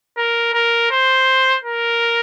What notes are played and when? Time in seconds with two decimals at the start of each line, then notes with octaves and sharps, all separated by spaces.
0.17 A#4
0.54 A#4
0.91 C5
1.64 A#4